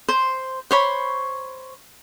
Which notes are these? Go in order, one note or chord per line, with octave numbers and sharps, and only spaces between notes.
C5
C5 C#5 B5